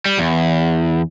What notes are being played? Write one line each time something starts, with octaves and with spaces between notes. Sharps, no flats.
G3
E2